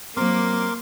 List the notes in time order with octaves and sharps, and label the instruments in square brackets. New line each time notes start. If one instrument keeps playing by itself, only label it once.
[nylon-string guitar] F#3 C4 [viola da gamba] A#3 [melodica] A#4 C6 D6